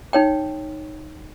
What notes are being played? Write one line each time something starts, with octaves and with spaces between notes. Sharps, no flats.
D#4 C#5 G5